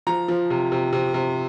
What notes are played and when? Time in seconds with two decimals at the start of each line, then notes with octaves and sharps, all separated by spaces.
0.07 F3 A#5
0.28 F3
0.50 C3
0.72 C3
0.93 C3
1.14 C3